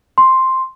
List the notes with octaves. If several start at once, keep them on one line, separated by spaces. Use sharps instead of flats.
C6